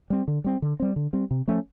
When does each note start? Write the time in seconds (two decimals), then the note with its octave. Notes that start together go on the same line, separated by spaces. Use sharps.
0.10 G3 C4
0.28 D3
0.44 G3 C4
0.62 D3
0.80 G3 C4
0.96 D3
1.13 G3 C4
1.31 C3
1.48 F3 A3 C#4